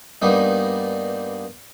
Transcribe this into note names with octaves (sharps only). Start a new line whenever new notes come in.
G2 G3 A#3 B3 D#4